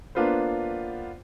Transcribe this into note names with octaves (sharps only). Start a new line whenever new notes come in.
A#3 B3 D4 F4 B4 C5